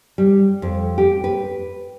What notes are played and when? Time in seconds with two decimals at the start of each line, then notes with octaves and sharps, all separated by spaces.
0.18 G3
0.62 F2
0.98 G4
1.24 B4